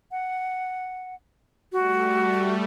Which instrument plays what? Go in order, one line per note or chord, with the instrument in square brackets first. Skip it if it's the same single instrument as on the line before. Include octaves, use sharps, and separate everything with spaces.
[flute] F#5
[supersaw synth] G3 A3 [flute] F#4